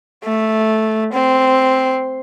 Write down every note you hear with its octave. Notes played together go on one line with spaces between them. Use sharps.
A3
C4